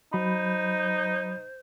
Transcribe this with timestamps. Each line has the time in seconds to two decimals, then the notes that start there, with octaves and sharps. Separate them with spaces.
0.13 F#3 D#4 C5 B5